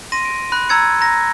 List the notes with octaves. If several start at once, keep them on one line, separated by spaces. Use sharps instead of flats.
C6 A#6 D#7
D7
B5 F#6
A#5 E6 G#6 A6 C#7
A#5 A#6